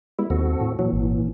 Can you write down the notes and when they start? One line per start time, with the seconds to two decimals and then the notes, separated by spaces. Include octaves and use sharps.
0.19 G3 G#3 B3 E4
0.30 D#2 C4 F#4 A4
0.61 A2
0.79 A#2 E3 F#3
0.93 G#1